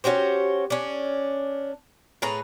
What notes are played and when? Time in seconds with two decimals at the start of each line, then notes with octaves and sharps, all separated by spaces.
0.04 C#4 F#4 G4 C5
0.70 C#4 D4
2.22 A2 G#4 B4 A#5